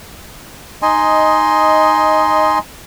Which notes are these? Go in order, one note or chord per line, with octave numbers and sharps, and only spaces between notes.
D#4 D#5 G#5 C6